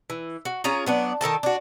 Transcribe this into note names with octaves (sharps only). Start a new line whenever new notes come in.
E3
F#4
C#4 F4 G#4 A#5
F#3 B3 D4
D#3 A4 A#4 A5
D4 F#4